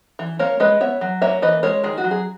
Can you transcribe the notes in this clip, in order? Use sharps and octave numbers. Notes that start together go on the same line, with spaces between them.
E3
A#3 A#4 C#5
G#3 B4 D#5
B3 C#5 E5
F#3
A#3 C#5 E5
E3 B4 D#5
G#3 A#4 C#5
D#3 G#4
F#4
F#3
G#4